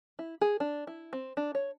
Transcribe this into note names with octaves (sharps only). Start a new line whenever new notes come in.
E4
G#4
D4
E4
C4
D4
C#5